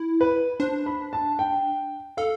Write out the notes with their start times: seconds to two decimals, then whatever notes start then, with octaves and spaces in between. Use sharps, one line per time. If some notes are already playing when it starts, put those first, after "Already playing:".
Already playing: E4
0.21 B4
0.60 D4 C5
0.86 B5
1.13 A5
1.39 G5
2.17 A4 F5